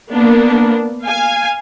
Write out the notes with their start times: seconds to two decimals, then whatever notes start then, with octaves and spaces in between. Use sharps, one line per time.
0.12 A#3 B3 D4
1.05 F5 G#5